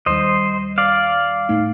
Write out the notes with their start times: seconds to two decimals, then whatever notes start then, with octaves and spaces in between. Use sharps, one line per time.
0.06 D#2 D#3 G3 C5 D#5
0.78 D5 F5
1.49 A2 A3 D#4